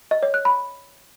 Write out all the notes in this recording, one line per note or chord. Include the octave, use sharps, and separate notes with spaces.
D#5
C#5
F#6
B5